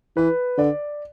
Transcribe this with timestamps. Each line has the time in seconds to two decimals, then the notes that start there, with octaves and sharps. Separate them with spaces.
0.17 E3 B4
0.58 D3 D5